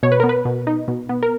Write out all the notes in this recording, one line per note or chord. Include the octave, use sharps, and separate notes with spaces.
B2 C#5
B4
A#4
B3
B4
B2
D#4
B2
B3
A#4